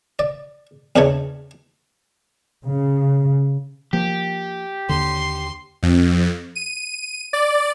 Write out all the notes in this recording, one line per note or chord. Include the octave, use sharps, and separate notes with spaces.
D5
E2 C#3 E3 D4 D#4 C#5
C#3
F3 A#3 G4
D#2 D3 C6
F2
D#7
D5